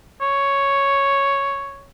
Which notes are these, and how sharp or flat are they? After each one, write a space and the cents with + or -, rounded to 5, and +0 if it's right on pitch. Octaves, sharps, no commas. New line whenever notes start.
C#5 +0